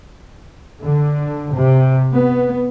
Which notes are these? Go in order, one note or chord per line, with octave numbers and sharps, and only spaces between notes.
D3
C3
B3